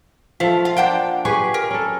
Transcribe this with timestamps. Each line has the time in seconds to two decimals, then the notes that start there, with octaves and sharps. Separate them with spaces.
0.40 F3 A3 E5 F5
0.65 F4 F5
0.77 A#3 D4 C5 F#5 G5
1.25 G4 G#4 B4 C#6
1.54 A#4
1.71 C#4 A4